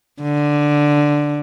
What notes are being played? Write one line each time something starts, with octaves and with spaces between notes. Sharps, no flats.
D3